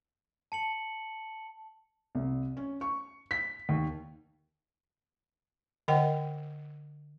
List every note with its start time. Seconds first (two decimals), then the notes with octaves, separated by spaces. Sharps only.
0.52 A5 C#7 F#7
2.15 C2
2.57 C#4
2.81 C#6
3.31 B6
3.69 D#2
5.88 D3 A#4 D#5 F#5 G5